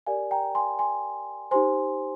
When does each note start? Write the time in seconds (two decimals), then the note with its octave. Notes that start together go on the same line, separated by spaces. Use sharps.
0.06 G4 A#4 D5 F5 G#5
0.31 G5 A#5
0.55 G#5 C6
0.79 G#5 C6
1.51 D#4 G4 C5 G#5 C6